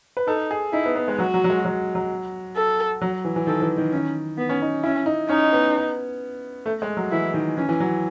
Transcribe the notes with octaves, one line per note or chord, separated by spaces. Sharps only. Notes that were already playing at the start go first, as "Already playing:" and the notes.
B4
D#4 A4
G#4
D#4 E4
B3
B3
G#3
F#3 F#4
F#3
F#3
G#3
F#3
F#3
A4
F#3
E3
E3
D#3 A4
E3
D#3
D#3 C#4
B3
C#4
D#4
C#4 E4
D#4
C#4 D#4
B3
A3
G#3
F#3
E3 E4
D#3
E3 C#4
E3
F#3